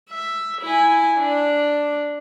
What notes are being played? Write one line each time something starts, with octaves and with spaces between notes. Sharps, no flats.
E5
E4 G#5
D4